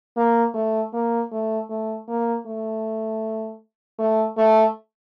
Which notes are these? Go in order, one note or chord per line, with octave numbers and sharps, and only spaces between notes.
A#3
A3
A#3
A3
A3
A#3
A3
A3
A3